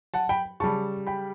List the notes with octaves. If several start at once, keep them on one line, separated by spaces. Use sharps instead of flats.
F#5 A5
G5 B5
C#3 G3 A5 C#6
G5 B5